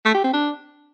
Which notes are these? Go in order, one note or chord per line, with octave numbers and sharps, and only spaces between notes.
A3
G4
C4
D4